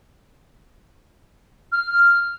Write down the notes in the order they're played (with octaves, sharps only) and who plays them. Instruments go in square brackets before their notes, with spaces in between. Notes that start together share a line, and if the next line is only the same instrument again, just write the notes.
[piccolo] F6